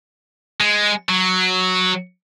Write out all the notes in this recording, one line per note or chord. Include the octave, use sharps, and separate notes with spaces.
G#3
F#3